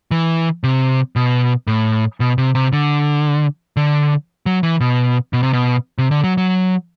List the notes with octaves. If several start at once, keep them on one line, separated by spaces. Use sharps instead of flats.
E3
C3
B2
A2
B2
C3
C3
D3
D3
F#3
E3
B2
B2
C3
B2
C3
D3
F#3
F#3